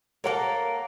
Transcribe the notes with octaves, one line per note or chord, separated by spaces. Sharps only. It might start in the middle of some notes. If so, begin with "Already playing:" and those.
A#3 A4 A#4 C#5 F#5